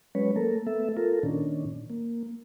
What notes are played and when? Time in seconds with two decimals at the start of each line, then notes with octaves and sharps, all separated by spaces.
0.15 F#3 G#3 C#4 B4 C#5
0.36 A3 A#3 A4 A#4
0.67 A3 B3 A4 E5
0.97 F4 A4 A#4
1.23 A#2 D#3 C#4 D4
1.90 A#3